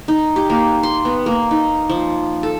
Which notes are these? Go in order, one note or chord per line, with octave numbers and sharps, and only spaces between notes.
D#4
G4
A#3
C6
B3
A#3
D#4
F3
A4